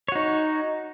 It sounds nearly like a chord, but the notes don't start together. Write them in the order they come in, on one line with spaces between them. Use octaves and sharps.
C#5 F#4 D#4